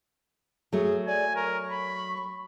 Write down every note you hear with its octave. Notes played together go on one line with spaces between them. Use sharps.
F#3 A3 G#4
D5 G#5
A#4 C#6
B5